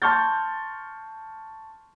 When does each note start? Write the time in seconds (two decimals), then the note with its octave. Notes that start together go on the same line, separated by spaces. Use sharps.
0.02 A5 C6 C#6 F6 G6 A6